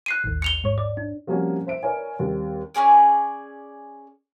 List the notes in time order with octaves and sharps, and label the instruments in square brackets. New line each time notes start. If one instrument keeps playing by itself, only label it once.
[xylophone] F#6 C7 D#7
[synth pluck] A1 D#2
[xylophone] C#7 F7 G7
[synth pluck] G#2 C#5
D5
D4
[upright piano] F3 G3 A#3 C4 C#4 F#4
C5 E5 D7
A#4 B4 C#5 D5 E5 G#5
D#2 G3 C4
[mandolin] C#4 E4 G#4 D5